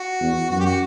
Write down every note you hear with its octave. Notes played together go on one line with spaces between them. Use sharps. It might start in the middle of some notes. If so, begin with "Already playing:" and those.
Already playing: F#4
E2
F#2 F#4
G4
F#4